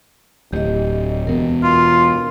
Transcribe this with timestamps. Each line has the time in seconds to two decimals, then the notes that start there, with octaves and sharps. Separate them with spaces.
0.53 D1 G4 D#5
1.27 E2 B2 A#4
1.63 F4